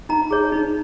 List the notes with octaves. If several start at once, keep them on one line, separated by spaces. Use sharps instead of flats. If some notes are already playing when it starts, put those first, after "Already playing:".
D#4 A#5
G#4 C#5
D#4